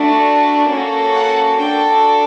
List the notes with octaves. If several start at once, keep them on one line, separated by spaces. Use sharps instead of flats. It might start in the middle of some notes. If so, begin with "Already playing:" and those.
Already playing: A3 D4 F#4
A#3 C#4 F#4 A4
F#5
D4 F#4 A4 G5